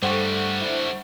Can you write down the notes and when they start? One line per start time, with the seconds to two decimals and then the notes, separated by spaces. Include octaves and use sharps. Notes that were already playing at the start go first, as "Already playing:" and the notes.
0.02 G2 D3 G3 A3 C5 F#5 C#6
0.60 D4 E4